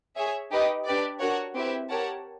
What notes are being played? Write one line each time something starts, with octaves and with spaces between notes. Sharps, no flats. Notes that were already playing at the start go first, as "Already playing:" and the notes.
G#4 C#5 E5
D#4 G4 B4 D#5
D4 G4 B4 D5
D4 F#4 A#4 C#5 F#5
C4 E4 G4 B4 E5
G4 A#4 C#5 F#5 A5